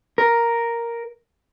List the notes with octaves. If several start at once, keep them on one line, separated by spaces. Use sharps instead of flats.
A#4